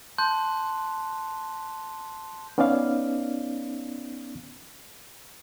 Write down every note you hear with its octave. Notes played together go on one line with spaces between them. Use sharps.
A5 C6 F#6 G6
B3 C#4 D#4 D5 F5